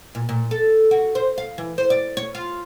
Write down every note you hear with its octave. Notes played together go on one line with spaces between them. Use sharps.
A#2
A#2
A4
F#4
C5
F5
E3
C5
D5
C#5
F4